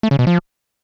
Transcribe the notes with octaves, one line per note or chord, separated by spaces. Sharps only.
A3
C#3
B2
F3